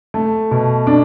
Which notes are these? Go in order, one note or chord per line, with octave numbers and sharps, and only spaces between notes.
A3
B2
D4